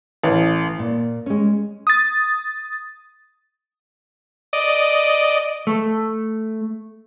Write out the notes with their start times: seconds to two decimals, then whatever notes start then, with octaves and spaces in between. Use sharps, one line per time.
0.24 A1
0.79 A#2
1.26 G#3 C#4
1.87 D#6 A6
4.53 D5 D#5
5.67 A3